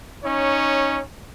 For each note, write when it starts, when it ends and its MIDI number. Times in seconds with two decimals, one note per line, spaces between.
0.24 1.01 61
0.24 1.01 63
0.24 1.01 73